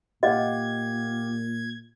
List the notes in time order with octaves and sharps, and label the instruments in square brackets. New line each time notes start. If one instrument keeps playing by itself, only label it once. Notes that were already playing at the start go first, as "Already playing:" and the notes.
[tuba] A#2 [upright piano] G4 F5 F#5 [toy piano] D#5 [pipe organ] G#6